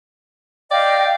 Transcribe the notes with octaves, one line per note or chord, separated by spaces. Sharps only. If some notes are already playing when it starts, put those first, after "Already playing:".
D5 D#5 F5 G5